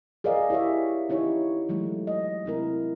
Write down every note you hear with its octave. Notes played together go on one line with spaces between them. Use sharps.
G#4 A#4 D5 D#5 F5
E4 G4 C#5 E5
C#4 D#4 E4 G4 C#5
E3 F#3 G#3 A3
D#5
C3 C4 E4 A#4